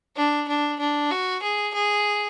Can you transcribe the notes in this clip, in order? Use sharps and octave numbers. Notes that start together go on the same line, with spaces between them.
D4
D4
D4
F#4
G#4
G#4